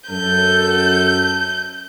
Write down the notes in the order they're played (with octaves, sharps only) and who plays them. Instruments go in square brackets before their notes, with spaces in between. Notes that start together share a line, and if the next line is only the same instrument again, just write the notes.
[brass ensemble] F#2 A4 [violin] G6